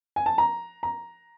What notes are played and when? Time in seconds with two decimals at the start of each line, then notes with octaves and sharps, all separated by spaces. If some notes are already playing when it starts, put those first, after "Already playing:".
0.16 G#5
0.26 A5
0.38 A#5
0.83 A#5